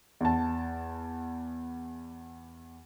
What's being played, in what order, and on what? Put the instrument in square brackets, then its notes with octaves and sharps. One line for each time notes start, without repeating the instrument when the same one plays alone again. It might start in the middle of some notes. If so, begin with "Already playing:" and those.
[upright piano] E2 A5